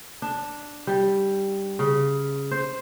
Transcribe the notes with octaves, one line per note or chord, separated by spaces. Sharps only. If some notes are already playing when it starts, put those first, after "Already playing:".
D4
G3
C#3
C5